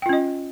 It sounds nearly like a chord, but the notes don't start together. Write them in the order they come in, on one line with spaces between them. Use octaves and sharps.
G5 F4 C#4 D#5